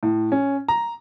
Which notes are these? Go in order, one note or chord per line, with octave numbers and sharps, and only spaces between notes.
A2
C#4
A#5